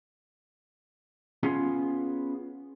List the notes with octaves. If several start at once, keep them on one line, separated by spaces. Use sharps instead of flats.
B3 C#4 F4 G#4